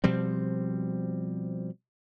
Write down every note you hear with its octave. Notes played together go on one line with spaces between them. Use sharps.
B2 F3 G3 C4